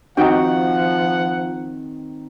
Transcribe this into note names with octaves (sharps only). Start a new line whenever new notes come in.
D#3 F3 C4 D#4 F#4 F#5 G5